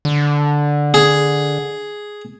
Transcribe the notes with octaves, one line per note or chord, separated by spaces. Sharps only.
D3
G#4